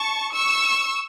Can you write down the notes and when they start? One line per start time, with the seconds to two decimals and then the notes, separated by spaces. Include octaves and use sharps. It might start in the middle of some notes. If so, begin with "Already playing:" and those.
Already playing: A5 C#6
0.34 C#6 E6